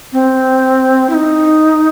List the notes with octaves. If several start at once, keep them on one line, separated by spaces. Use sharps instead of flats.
C4
E4
D#4